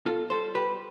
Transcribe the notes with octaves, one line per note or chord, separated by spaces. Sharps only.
B2 F4 A4
G3 A4 C5
G3 G4 B4